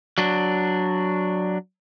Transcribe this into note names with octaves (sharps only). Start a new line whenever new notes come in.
F#3 D4